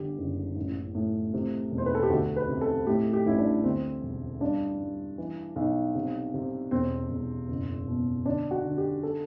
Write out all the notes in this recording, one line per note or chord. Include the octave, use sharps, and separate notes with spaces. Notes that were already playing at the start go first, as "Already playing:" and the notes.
Already playing: G1 D3 G4
F#1
A1
A2
C3
E1
C5
B4
A4
G4
D2 F#4
B4
C3
A4
A2 G4
G4
A1 E4
D4
D2 C4
E1
G2 D4
G2
E3
B1
C3
C3
E1 C4
E1
F#1
B2
D3 D4
F#4
D3
G4
A4